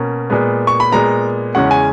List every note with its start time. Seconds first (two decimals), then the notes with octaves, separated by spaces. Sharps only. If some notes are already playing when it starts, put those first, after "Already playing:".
Already playing: B2 A#3 C#4
0.30 A#2 G#3 B3
0.67 C#6
0.80 B5
0.92 A#2 G#3 B3 A#5
1.55 E2 C#3 G#3 C#4 F#5
1.71 G#5